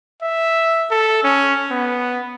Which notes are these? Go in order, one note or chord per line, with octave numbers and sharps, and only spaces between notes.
E5
A4
C#4
B3